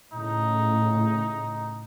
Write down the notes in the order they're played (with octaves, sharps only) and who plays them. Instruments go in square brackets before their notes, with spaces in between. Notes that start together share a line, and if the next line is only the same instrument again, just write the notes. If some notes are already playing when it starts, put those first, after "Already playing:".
[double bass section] A2 C#3 [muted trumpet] D#4